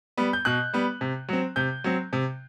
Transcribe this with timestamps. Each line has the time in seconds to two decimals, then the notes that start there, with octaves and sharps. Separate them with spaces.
0.17 G3 B3
0.33 G6
0.45 B2 F#6
0.73 G3 B3
1.01 C3
1.29 F#3 C4
1.56 C3 G6
1.84 F#3 C4
2.13 C3